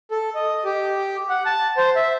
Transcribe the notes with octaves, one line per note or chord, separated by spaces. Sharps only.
A4
D#5
G4
F#5
A5
C5
E5